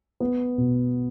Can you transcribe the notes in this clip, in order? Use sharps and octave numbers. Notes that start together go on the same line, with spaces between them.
B3
B2